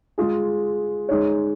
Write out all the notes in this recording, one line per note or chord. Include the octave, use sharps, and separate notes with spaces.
G#3 F4 G#4
G#3 D#4 C#5